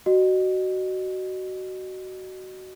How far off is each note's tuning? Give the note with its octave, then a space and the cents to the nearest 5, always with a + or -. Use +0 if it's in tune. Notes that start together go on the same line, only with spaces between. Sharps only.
F#4 +15 D#5 -30